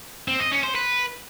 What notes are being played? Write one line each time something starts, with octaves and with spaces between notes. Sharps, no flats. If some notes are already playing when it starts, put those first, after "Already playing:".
C4
D#5
C#4
C5
B4